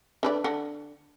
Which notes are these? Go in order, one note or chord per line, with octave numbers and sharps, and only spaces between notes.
D3 B4 D5
D3 F#5